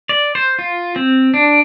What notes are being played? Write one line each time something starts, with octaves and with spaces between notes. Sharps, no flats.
D5
C5
F4
C4
D4